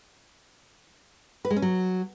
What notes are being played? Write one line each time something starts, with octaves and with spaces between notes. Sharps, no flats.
B4
G#3
C#4
F#3